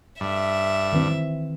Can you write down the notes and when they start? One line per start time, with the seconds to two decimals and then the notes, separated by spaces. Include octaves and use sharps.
0.21 G2 E5
0.93 D#3 E3 C4